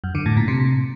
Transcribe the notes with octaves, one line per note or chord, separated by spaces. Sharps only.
F#2
D3
A2
A#2
C3